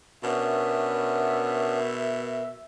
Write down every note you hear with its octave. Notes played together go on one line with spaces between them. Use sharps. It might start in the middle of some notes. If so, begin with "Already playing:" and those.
B2 B3 C#4 D4 A#4 E5